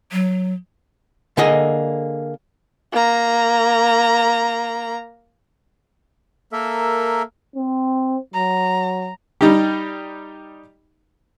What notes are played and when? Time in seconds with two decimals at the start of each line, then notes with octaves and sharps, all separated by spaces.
0.12 F#3
1.37 D3 A#3 G#4 D#5
2.92 A#3 A#5
6.52 A#3 A4 A#4 E5
7.56 C4
8.34 F#3 A#5
9.41 G3 D#4 G4